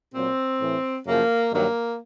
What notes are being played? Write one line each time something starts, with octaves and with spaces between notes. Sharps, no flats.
A#2 F#3 C4
A2 E3
F#2 C#3 F3 A#3
G2 D#3 F#3 A#3